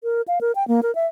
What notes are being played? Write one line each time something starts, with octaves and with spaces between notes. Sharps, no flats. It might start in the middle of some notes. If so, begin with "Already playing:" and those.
A#4
F5
A#4
G5
A#3
A#4
E5